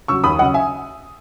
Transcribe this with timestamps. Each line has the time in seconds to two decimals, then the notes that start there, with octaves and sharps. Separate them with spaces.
0.08 C#3 C#6 E6
0.12 F#3
0.24 D#2 B5 D#6
0.39 F#3 D#5 F#5
0.42 C#3
0.54 E5 G#5